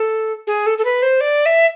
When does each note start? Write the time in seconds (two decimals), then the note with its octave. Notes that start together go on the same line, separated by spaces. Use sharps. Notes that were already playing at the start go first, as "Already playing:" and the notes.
Already playing: A4
0.47 G#4
0.66 A4
0.78 A4
0.85 B4
1.02 C5
1.21 D5
1.46 E5